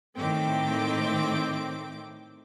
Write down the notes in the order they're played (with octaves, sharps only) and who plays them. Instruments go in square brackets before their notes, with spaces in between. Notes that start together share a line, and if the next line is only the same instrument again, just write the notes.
[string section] A2 D#3 A3 C4 G5 D6